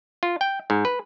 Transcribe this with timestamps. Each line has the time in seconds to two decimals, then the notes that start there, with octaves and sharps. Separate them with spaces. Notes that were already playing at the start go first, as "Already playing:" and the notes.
0.23 F4
0.41 G5
0.70 G#2
0.85 B4